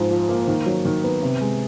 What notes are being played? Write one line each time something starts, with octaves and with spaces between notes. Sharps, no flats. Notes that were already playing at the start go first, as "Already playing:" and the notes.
Already playing: G#2 F3
F3
A#3
D#3
F#3
D#3
B3
C3
G#3